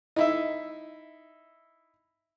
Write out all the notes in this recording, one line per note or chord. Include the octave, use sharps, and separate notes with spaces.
D#4 E4 E5